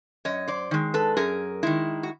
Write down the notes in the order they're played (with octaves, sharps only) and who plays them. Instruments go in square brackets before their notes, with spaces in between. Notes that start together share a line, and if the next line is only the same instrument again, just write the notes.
[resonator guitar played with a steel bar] F#2 C#5 D#5
C5 D5
D#3 G#3
A4 B4
F#2 G#4 A#4
D#3 G#3 E4
F#4